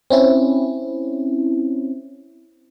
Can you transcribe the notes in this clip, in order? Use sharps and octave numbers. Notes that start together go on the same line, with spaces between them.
C4 C#4 E4